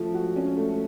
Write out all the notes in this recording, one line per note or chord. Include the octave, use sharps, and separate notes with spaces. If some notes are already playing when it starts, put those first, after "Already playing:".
Already playing: F3 A3 C#4
F#4
C#4
A3